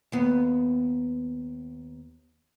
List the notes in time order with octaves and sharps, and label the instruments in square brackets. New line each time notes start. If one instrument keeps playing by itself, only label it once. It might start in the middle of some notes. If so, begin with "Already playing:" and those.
[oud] D#2 B3